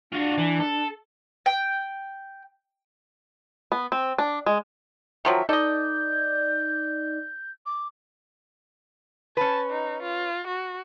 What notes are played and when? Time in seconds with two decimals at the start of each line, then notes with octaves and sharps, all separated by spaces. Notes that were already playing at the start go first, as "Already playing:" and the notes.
0.12 D4 F4 F#4
0.38 E3
0.60 A4
1.46 G5
3.72 B3
3.92 C4
4.18 D4
4.46 G#3
5.25 D#3 F3 F#3 E5
5.49 D#4 A4 D5 D#5 G6
7.66 D6
9.37 C#4 B4 A5
9.70 D#4
10.03 F4
10.47 F#4